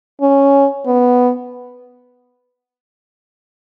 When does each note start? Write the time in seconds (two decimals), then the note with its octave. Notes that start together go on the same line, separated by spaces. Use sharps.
0.22 C#4
0.86 B3